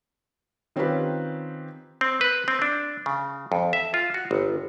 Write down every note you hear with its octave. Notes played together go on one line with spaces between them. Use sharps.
D#3 C4 C#4 F4 G4 B4
C4
B4
C4
D4
C#3
F2
E5
F4
F#4
G1